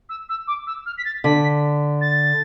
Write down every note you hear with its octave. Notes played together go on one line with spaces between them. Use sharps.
E6
E6
D6
E6
F6
B6
A6
D3 B6
A6